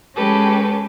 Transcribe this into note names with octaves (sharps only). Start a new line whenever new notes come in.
G#3 C#4 G4 A4 B4